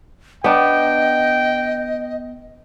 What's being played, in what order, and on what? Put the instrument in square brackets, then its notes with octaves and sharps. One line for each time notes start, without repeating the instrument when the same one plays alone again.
[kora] B3 D4 [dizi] D#5 [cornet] G5